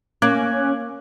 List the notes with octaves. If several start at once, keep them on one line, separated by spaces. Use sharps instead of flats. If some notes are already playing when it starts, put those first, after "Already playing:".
A#3 C#4 D6 F#6 G#6